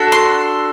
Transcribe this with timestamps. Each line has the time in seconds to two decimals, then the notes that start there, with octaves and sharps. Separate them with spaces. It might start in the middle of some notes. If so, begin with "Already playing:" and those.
Already playing: D4 F#4 A4
0.12 C6